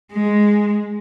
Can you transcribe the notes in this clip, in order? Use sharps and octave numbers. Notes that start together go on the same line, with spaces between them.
G#3